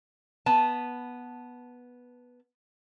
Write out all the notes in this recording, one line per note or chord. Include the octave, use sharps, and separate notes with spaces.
B3 A5